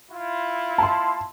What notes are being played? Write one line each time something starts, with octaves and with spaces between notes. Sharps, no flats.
E4 F4
A5 C6